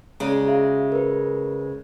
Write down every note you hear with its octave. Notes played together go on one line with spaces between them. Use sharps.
C#3 G#3 G#4 D5 A#5
F#4 E5 F5
A#4 B4